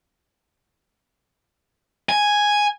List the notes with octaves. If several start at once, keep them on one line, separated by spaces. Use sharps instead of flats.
G#5